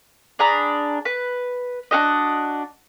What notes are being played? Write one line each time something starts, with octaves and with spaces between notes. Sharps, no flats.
D4 G#4 A#5 B5
B4
D4 F#4 G4 D#5